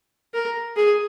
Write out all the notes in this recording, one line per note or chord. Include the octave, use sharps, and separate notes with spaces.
A#4
G#4